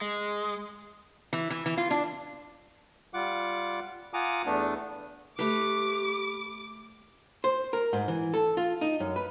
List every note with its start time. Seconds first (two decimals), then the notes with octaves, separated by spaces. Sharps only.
0.01 G#3
1.33 E3
1.50 E3
1.66 E3
1.77 F4
1.91 D4
3.14 G3 F4 F#5 D6
4.14 F4 F#5 G#5 A#5 D6 D#6
4.46 E2 A3 B3 D4
5.39 A3 G4 B4 D6
7.44 C5
7.73 A#4
7.93 G#2
8.08 E3
8.34 A4
8.57 F4
8.81 D#4
9.00 F#2
9.16 B4